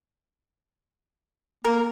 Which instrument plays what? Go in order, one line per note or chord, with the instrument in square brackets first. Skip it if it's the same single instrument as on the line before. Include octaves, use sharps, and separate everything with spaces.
[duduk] A#3 [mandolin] A#4